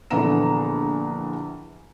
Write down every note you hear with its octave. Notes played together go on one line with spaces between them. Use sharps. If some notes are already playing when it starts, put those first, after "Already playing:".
A#1 D3 E3 B3 A#5 E7